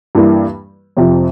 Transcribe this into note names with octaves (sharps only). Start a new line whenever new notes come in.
G2 E3 A#3 D4
F2 C3 F3